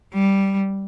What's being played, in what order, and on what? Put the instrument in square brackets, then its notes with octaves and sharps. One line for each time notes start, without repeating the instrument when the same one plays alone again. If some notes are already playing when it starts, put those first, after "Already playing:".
[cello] G3